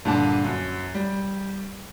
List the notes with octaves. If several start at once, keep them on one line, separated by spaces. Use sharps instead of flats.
G2 A#2 D3 A5
F#2
G3